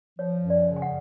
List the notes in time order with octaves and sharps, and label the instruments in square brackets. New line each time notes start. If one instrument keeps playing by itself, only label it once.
[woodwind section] F3 [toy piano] C#5
[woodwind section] F#2
[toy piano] D5
[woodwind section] C#3
[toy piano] G#5
F#5